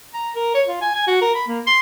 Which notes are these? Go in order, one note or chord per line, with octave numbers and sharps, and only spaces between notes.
A#5
A#4
C#5
F4
G#5
G#5
F#4
A#4
B5
A#3
C6